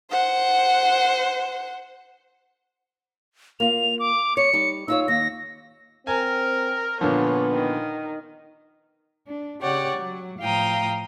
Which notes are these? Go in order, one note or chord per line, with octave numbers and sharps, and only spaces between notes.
C5 F#5
A#3 F4 F7
D6
C#5 C#7
G3 D#4
D#4 F4 C#5 E6
D#2 A#6
C4 A#4 G#5
A#2 D3 F3 B3 C#5
D#3
D4
C#3 G4 C#5 D5 F#5 G5
F#3
A2 F3 F5 G5 A#5 D#6